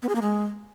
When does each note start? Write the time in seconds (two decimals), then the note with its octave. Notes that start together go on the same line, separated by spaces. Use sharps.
0.02 B3
0.09 G#4
0.15 A#3
0.22 G#3